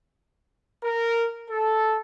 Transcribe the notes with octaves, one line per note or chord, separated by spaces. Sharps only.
A#4
A4